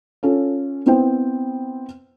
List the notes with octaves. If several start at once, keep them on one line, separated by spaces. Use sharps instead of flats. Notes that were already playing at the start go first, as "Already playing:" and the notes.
C#4 F4 A4
B3 C4 E4 C5 G5